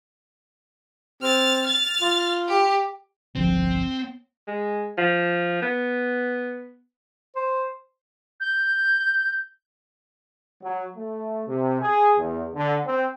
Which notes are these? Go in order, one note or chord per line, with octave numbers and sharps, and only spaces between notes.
C4 F6 A6
F6 A6
F4
G4
G1 C2 F3 C4
G#3
F3
B3
C5
G6
F#3
A3
C3
G#4
E2
D3
C4